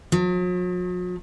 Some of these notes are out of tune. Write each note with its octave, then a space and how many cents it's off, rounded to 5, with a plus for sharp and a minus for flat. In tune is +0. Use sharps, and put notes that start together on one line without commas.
F#3 -45